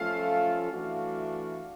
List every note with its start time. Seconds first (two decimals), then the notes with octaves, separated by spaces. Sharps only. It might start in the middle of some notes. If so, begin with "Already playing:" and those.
Already playing: F3 A3 C#4 F4 A4 F5
0.71 E3 A3 D4 F#4